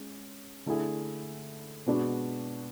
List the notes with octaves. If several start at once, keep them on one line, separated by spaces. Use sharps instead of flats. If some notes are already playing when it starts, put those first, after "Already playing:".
Already playing: G#3 C#4
D3 A3 E4 G#4
B2 G#3 B3 D4 F#4